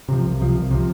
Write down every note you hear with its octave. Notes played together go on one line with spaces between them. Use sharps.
C3 F3
C2
C3 F3
C2
C3 F3